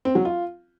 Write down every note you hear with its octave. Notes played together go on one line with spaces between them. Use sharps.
C4
F#3
F4